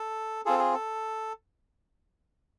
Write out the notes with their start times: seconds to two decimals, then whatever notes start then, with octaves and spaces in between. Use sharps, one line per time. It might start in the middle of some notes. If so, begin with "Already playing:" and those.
Already playing: A4
0.45 C4 F4 G#4 A4
0.59 G#4
0.74 A4